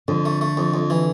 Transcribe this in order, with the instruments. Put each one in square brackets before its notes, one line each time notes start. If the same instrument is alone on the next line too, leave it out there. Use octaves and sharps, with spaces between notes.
[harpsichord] F2 [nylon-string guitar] D3
[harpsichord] A3
A3
F2
F2
E3